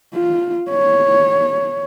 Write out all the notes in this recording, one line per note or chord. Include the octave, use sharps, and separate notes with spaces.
F4
C#5